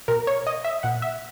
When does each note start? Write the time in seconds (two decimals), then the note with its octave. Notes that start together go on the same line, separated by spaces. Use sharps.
0.08 B2 A#4
0.27 C#5
0.47 D#5
0.64 E5
0.83 A#2 F#5
1.02 E5